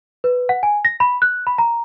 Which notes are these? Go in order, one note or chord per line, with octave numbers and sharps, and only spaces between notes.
B4
F#5
G#5
A#6
B5
F#6
B5
A#5